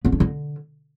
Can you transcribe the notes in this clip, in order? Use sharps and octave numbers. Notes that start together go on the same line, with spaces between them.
B3
D4
D3